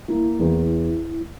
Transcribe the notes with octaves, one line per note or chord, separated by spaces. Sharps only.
A#3 E4
E2